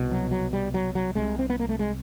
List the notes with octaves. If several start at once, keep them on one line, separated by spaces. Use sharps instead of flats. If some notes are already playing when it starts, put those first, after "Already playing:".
Already playing: C2 B2
F#3
F#3
G3
F#3
F#3
C2 C3 G#3
C4
B3
A#3
A3
G#3